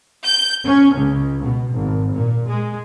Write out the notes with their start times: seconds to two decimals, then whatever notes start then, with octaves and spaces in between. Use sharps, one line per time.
0.24 G6
0.64 C#4
0.94 C#2
1.42 B2
1.72 G#1
2.11 A#2
2.45 G#3